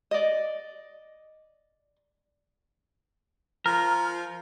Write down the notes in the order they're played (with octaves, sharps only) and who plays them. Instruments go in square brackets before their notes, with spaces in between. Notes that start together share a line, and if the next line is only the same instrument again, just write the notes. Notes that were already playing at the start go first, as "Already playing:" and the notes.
[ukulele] D5 D#5
[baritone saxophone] F3 [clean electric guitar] A#4